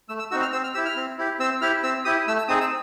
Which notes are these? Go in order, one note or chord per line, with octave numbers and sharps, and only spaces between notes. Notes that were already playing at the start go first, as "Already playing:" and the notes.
A3 E6
E6
C4 D#4 F#4 E6
F6
C4 E6
F6
E4 G4 E6
F6
C4
E4 G4
C4 E6
E4 G4 F6
C4 E6
E4 G4 D#6
A3 E6
E6
C4 D#4 G#4 D#6
E6